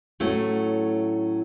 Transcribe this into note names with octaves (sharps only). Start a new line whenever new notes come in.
A2 F#3 A3 C#4